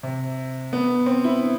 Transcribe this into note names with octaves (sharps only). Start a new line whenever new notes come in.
C3
B3
C4
E4